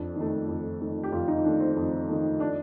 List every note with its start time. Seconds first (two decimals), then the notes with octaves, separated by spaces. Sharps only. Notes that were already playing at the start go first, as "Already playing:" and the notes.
Already playing: F2 D4
0.16 D#3
0.21 A3
0.48 F2
0.80 D#3 A3
1.04 G4
1.12 F2 F4
1.28 D#4
1.44 D#3 A3 D4
1.60 C4
1.76 F2
2.09 D#3 A3
2.40 D4